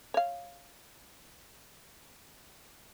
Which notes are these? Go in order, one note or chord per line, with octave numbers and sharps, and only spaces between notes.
C#5 F5